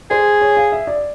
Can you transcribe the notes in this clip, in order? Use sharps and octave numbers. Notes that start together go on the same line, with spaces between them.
G#4 C5
C#5
F5
E5
D5